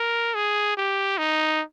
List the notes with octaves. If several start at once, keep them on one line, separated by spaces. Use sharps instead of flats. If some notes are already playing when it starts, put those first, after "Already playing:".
Already playing: A#4
G#4
G4
D#4